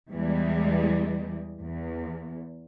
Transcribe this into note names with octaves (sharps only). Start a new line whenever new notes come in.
E2 E3 G3 G#3
E2